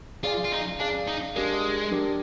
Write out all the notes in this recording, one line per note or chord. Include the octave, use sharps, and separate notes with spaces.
F4 G#4 D5 F5 G#5
F4
D#4
D4 G#4 D5 F5 G#5
D#4
G#3 D4 G4 A#4 D5
D4 G4 A#4 D5